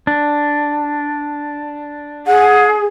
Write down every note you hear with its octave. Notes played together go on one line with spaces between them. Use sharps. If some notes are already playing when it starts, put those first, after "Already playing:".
D4
G#4 F#5